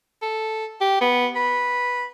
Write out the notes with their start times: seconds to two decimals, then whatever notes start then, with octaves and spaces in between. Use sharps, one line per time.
0.22 A4
0.81 G4
1.01 B3
1.36 B4